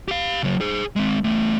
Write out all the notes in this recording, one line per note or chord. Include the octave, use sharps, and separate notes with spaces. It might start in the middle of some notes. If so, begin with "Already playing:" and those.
G4 F5
C#3 F#3
G#4 C5
G#3 C4
E2 A3